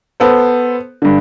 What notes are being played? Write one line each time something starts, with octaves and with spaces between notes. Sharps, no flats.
B3 A4 C5
G2 D3